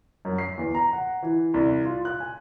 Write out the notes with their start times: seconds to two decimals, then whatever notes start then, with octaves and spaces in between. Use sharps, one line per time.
0.25 F#2
0.38 C7
0.58 E2
0.75 A#5
0.93 F#5
1.23 E3
1.54 C2
1.85 F4
2.05 F#6
2.20 G#5